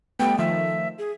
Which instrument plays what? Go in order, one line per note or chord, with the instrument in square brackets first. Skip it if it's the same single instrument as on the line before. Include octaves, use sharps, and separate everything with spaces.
[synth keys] G3 A3 B3 [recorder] G5
[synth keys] D#3 F3 A3 [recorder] E5
[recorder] G#4